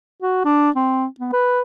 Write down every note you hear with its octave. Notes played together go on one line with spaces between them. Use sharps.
F#4
D4
C4
B3
B4